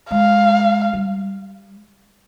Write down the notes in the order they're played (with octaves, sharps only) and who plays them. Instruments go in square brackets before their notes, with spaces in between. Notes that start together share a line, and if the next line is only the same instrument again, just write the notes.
[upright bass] G#3 [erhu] F5
[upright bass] G3